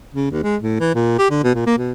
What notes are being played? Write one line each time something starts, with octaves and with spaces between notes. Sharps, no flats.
C#3
D#2
G#3
A2
E3
A#2
G4
D3
B2
A#2
A#3
B2